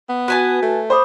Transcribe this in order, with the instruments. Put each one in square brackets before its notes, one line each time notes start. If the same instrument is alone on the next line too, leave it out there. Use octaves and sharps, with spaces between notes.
[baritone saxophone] B3
[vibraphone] F#4 [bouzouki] B4 G#5 A5
[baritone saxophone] A3
[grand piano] C5 [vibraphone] B5 D6 D#6